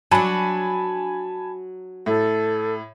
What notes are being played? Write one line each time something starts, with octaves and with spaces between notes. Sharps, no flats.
F#3 D4 G#5 A5 B5
A2 A4